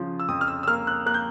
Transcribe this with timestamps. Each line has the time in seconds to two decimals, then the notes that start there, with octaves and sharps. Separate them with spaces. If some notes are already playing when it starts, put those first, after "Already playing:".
Already playing: C#3 F3
0.20 E6
0.29 F2 D#6
0.41 F6
0.48 E6
0.63 E6
0.67 A#3 F6
0.87 F#6
1.06 A#3 F#6
1.14 G6